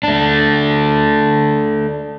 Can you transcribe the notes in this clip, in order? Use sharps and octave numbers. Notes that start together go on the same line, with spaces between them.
A3 D4